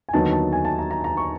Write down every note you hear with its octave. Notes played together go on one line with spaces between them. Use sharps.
G#5
D#2 D3 F#3 B3 D#4 A5
A5
G#5
A5
A#5
A#5
A#5
C#6